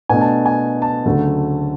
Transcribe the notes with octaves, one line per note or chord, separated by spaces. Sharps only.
B2 A3 D4 G#5
A5
G#5
A5
D2 C#3 F#3 A3